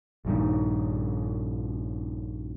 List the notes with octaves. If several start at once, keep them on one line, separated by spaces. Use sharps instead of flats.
A#1 G2 D#3